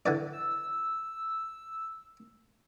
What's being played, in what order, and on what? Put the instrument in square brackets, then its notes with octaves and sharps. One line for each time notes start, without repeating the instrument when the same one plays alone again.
[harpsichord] D3 E3 D5
[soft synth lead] E6